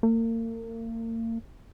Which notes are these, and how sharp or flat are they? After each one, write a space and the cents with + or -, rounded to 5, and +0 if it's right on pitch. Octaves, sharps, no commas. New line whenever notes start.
A#3 -40